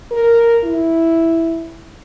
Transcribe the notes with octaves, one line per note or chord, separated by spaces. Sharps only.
A#4
E4